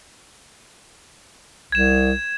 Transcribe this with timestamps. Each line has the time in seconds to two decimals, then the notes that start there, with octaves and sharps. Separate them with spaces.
1.72 C2 G#6 E7